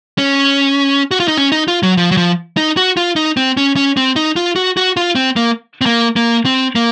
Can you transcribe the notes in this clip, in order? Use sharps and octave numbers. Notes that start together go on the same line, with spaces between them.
C#4
F#4
F4
D#4
C#4
D#4
F4
F#3
F3
F#3
F3
D#4
F#4
F4
D#4
C4
C#4
C#4
C4
D#4
F4
F#4
F#4
F4
C4
A#3
C4
A#3
A#3
C4
A#3